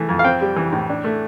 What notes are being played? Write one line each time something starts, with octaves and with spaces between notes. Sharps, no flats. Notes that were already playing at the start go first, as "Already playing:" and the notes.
Already playing: E3 A3
F2
F5
C4 G5
G3
E3
A2
D4
A3